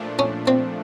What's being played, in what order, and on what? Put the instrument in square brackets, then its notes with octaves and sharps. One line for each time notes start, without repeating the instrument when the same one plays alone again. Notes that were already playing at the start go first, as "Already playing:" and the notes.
Already playing: [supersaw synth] A#2 F3 A3 D4
[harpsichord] C#4
C4